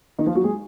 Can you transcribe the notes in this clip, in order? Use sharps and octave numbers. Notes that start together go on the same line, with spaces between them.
D#3 D#4
F3 F4
F#3 F#4
G#3 G#4